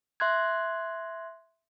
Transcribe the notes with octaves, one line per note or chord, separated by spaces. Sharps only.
E5 C6 F#6 G#6